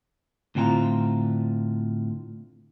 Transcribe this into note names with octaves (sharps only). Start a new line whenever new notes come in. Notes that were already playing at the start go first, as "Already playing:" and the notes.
A2 D3 C4 F4 F#5 A#5